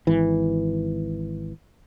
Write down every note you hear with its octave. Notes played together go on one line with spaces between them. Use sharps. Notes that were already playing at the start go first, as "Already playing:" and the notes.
G#1 E3